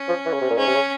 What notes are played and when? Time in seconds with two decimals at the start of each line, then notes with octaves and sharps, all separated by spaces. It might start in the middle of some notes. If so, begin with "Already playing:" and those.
Already playing: C#4
0.08 F3
0.25 E3
0.33 C#3
0.41 C3
0.50 A#2
0.57 G#2 C#4
0.67 C3
0.75 C#3